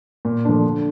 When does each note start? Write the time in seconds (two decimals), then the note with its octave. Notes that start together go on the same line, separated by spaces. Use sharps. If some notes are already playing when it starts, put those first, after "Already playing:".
0.25 A#2
0.45 F3 A3 D4
0.64 D3